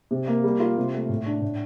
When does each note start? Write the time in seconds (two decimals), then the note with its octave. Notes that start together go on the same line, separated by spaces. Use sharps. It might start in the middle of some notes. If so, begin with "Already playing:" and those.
0.11 C3
0.27 A#3
0.44 G3
0.60 F4
0.77 C3
0.93 A3
1.09 A2
1.26 D4
1.42 A2